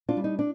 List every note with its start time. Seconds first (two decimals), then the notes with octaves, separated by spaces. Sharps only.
0.09 D4 F4
0.17 G3
0.24 D#4
0.39 D4